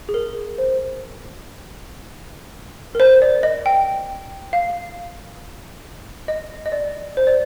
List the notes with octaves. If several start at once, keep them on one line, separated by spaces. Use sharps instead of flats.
G#4
A#4
C5
A#4
C5
D5
D#5
G5
F5
D#5
D#5
D5
C5
D5